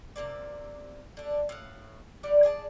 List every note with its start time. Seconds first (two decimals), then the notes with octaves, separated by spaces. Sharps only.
0.16 C3 G#3 A#3 D5
1.17 D3 D4
1.49 A2 F5 F#5
2.23 G3 D5 F#5
2.43 G#4 D5 G#5 A5